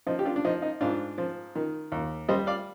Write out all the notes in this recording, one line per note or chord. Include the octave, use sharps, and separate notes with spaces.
F3 D#4
G4
D4 F4
D4
F3 D#4
D#4
G#2 D4 F4
F3
D#3
D#2
G3 C5 D#5
D5 F5